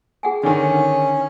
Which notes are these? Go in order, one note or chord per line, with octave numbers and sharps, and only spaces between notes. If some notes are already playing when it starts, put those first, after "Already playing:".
G#4 F#5 G#5
D3 D#3 C#4